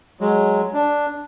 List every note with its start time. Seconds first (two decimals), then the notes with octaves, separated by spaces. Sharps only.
0.21 F#3 G#3
0.74 D4